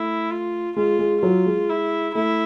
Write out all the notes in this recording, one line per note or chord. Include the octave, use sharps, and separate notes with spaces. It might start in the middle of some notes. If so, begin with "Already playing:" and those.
Already playing: A3 E4
F4
G#3 F4
G#3
F#3 F4
G#3
E4
A3 E4